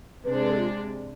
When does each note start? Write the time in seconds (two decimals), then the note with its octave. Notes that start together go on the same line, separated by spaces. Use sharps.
0.24 C3 G#3 D4 B4
0.34 C5
0.42 B4
0.51 A4
0.58 F4